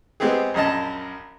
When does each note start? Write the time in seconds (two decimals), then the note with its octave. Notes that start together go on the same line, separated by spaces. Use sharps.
0.20 G#3 B3 C4 G4 G#4
0.54 A#1 F#2 D#5 A5